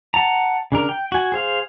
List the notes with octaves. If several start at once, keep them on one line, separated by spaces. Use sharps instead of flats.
F#5 A5 A#5
C#3 D4 A#4
G5
F#4 G#5
G#4 C5 F5